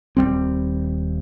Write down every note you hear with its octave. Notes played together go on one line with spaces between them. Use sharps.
D#1 G2 G3 C4